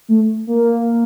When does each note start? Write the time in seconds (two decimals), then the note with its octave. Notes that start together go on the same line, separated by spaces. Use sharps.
0.08 A3
0.47 A#3